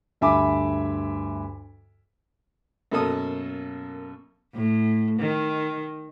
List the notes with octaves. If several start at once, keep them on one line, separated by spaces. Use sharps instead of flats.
D2 G2 E5 G#5 B5 D6
F#2 B2 A#3 A4 D#6
A2
D#3